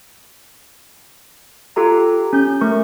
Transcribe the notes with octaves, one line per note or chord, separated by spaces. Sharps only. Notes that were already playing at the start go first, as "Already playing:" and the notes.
F4 G4 A4 A#5
C#4 G6
A3 A#4 C#6